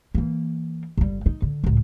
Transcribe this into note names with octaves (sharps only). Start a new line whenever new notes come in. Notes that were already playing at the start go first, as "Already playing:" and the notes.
E3 A#3
G1 G3
D#4
D3
C#2 A2